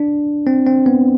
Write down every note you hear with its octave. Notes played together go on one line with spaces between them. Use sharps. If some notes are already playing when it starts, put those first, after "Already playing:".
Already playing: D4
C4
C4
B3